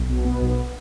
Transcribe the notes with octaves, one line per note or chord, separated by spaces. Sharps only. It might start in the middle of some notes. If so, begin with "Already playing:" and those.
Already playing: B1
B2
B3
B1